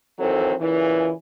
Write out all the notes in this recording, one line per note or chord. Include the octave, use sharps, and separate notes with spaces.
D#3 E3 F#3 C4 A4
A#2 C#3 E3